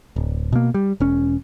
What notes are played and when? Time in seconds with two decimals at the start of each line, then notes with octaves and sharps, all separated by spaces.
0.16 D1
0.52 B2 A#3
0.74 G3
1.00 E1 C#4